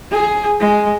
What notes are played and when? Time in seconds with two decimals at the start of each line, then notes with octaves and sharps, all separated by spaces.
0.11 G#4
0.60 G#3